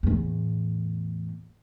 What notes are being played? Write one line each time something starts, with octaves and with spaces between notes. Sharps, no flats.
E2 A2